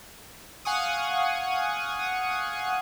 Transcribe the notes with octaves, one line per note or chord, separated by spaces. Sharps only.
F5 F#5 G#5 C#6 D#6